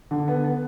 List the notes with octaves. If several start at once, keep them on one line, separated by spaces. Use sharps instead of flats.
D3
B3
B3